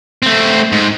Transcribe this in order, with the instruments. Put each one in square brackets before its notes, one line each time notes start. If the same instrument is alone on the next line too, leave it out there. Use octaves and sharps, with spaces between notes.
[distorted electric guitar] A3 C4
G#2